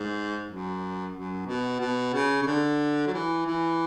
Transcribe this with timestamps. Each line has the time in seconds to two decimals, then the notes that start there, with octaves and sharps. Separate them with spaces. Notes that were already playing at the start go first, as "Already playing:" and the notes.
Already playing: G#2
0.47 F#2
1.13 F#2
1.46 B2
1.80 B2
2.13 C#3
2.42 C#3
2.47 D3
3.07 F#3
3.13 E3
3.46 E3